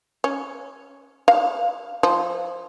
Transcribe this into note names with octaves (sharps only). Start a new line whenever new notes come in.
C#4
F5
F3